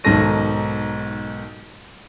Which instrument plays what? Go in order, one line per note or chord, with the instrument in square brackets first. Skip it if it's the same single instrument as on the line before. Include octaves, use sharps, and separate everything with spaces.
[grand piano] B1 G#2 D#3 A4 A#6 D#7